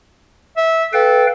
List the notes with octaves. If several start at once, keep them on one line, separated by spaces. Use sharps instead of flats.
E5
A4 B4 F5 G5